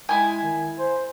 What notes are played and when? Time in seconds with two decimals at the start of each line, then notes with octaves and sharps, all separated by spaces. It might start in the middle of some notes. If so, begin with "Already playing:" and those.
0.09 G#3 E4 G#5
0.43 D#3
0.79 C5